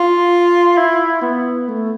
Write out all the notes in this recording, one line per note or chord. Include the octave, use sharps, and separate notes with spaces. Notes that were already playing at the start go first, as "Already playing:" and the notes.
Already playing: F4
E4
B3
A3